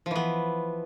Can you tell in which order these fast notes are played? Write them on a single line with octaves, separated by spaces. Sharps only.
F3 E3 B3